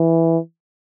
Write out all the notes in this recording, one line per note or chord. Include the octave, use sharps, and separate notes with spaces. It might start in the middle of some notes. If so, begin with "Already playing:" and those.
Already playing: E3